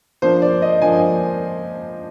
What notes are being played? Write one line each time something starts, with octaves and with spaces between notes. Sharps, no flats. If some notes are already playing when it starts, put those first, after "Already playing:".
F3 A#3 D4 C5
D5
D#5
F3 A#3 D4 G#5